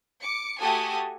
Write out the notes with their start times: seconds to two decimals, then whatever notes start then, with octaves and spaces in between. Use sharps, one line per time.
0.23 D6 C#7
0.61 A3 F#4 G4 A4 G#5 D#6